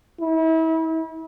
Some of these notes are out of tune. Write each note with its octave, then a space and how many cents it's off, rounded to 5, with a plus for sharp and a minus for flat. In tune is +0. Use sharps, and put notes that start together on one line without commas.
E4 -35